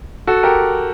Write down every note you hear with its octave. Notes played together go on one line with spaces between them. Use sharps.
F#4 A4
G4 A#4